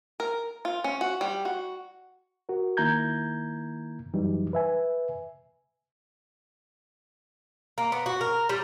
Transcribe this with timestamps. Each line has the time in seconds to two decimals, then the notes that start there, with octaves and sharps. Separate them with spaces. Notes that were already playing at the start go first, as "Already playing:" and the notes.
0.20 A#4
0.65 F4
0.84 C#4
1.01 F#4
1.21 G3
1.45 F#4
2.49 F#4 A#4
2.77 D#3 A#3 E4 A#5 G6 G#6
4.14 F#2 E3 F#3 G3 D#4
4.53 B4 E5 G#5
7.78 A#3
7.92 B3
8.06 F#4
8.21 A#4
8.49 G3